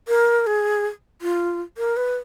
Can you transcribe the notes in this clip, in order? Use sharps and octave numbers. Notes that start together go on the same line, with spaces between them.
A#4
G#4
F4
A#4
B4